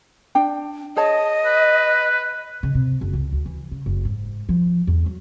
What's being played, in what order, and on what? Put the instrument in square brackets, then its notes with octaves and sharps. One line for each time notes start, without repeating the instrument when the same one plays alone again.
[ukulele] D4 G5
[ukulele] G#4 C#5 A5 [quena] D#5
[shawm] B4
[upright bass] C#3
C3
F#1
C#2
D2
E3
C#3
F#1
G#2
F3
E2
F#3